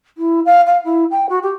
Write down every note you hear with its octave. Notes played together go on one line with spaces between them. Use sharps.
E4
F5
F5
E4
G5
F#4
G4